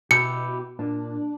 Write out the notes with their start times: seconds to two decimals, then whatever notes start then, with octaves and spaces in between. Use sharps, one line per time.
0.11 B2 E4 G4 C#7
0.79 A#2 D4